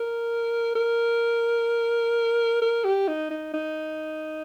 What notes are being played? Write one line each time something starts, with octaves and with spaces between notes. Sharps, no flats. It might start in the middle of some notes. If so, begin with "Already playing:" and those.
Already playing: A#4
A#4
A#4
G4
D#4
D#4
D#4